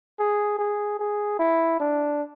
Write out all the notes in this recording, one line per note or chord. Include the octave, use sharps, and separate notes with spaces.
G#4
G#4
G#4
E4
D4